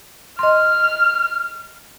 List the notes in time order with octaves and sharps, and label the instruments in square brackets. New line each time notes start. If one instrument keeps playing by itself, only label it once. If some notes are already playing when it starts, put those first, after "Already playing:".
[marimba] D#5 C6 [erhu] F6